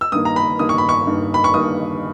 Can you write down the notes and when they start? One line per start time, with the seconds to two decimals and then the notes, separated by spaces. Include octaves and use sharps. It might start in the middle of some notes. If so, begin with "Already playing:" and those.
0.01 E6
0.12 G2 D#3 A#3 D#6
0.25 A#5
0.36 B5
0.59 G2 D#3 A#3 D#6
0.69 C#6
0.78 B5
0.89 C#6
1.07 G2 D#3 A#3
1.34 B5
1.44 C#6
1.54 G2 D#3 A#3 D#6